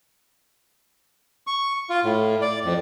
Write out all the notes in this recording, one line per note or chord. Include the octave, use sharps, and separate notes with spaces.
C#6
F4
A2
D5
F2